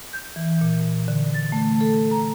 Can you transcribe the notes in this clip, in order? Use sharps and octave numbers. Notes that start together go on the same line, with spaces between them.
G6
E3
A#2
D3
A6
A3
A4
A#5